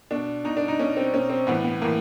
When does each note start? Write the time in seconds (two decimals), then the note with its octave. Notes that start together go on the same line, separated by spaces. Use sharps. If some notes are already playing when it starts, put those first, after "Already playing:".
0.11 B2 D4
0.44 B2 D#4
0.57 D4
0.68 D#4
0.79 B2 C#4
0.97 C4
1.13 B2 C#4
1.30 C4
1.47 A2 E3 B3
1.64 B3
1.81 A2 E3 A#3